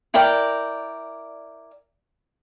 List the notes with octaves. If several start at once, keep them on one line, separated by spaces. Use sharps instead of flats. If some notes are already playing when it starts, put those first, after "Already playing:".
E4 A#4 D5 G5